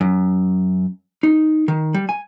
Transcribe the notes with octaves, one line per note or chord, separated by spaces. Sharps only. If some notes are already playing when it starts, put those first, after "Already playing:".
F#2
D#4
D#3
G3
G#5